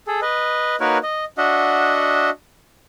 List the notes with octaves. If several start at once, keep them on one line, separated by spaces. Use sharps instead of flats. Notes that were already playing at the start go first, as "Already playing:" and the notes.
G#4 A4
B4 D#5
A#3 D#4 F#4 A#4 B4 C#5
D#5
D4 F#4 D#5 E5 F#5